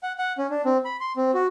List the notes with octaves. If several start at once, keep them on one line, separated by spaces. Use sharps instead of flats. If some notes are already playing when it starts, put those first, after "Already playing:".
F#5
F#5
C#4
D4
C4
B5
C6
C4
F#4